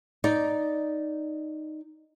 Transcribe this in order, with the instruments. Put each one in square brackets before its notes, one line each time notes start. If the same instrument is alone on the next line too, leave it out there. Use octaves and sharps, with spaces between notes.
[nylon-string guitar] D#4 D5